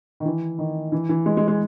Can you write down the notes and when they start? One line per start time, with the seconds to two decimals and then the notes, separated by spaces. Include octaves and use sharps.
0.20 D#3
0.25 E3
0.59 D#3
0.92 E3
1.09 E3
1.26 G#3
1.37 G#3
1.48 G#3